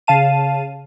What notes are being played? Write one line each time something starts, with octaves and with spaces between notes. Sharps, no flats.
C#3 F5 A5 D#7